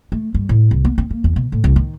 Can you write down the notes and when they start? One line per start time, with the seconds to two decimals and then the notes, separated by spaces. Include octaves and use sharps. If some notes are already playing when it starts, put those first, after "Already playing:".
0.12 A3
0.34 G2
0.49 A2
0.71 C2
0.85 B3
0.98 C4
1.11 A#3
1.24 E2
1.36 B2
1.52 A2
1.64 C2
1.76 D#3